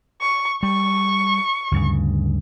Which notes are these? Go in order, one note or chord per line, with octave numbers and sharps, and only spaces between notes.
C#6
G3 C#6
D2 G2 C#3